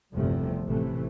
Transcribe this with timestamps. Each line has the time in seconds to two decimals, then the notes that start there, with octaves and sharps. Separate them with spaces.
0.14 G1 E2 G2 C3 F3 A3
0.65 A1 C3 E3 A3